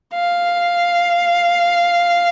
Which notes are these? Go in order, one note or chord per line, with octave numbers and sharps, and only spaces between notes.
F5